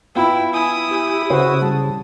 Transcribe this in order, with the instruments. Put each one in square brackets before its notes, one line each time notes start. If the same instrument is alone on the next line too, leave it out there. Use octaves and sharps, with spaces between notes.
[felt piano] B3 F4 B5 [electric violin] E4 [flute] G5
[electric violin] E4 D#6 [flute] G#5
[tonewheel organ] G4
[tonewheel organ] C#3 [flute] F#4 [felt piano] C5
[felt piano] G3 [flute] A5